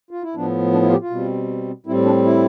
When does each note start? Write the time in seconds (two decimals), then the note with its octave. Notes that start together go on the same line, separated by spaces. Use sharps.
0.11 F4
0.23 E4
0.35 A2 F3 B3 D4
0.73 D4
0.83 E4
0.87 F4
0.92 G4
1.02 F4
1.10 B2 G3 C4
1.86 A2 G3 C4 E4
2.05 D4
2.25 E4